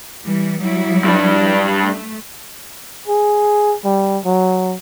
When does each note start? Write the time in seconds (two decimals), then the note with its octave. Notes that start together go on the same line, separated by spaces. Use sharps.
0.23 E3 G3
0.60 F#3 G3 E4
1.04 G2 D4
1.82 A3
3.08 G#4
3.84 G3
4.25 F#3